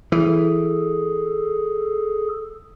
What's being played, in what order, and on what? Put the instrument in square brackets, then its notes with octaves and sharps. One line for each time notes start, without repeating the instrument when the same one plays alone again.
[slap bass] E3 [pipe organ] G#4 A4